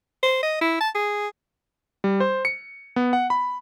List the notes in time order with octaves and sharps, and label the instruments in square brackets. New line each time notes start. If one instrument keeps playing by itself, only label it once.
[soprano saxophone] C5
D#5
E4
A5
G#4
[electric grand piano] G3
C5
C#7
B3
F#5
B5